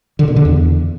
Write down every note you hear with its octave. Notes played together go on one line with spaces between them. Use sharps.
D3
A#2
D3
E2